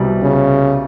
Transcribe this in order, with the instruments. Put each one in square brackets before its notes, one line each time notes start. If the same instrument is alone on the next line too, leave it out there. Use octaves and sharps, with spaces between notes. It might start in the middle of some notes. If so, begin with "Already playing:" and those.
Already playing: [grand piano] C2 B2 G3
[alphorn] C#3